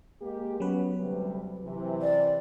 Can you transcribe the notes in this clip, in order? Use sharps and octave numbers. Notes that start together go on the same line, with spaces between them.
G#3 A#3 G4
F#3 B3 C#4 B4
D2 C3 G3
C3 E3
D5